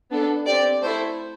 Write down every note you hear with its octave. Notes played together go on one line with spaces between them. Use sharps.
B3 D4 A4
C4 G4 D5
A3 E4 A4 C5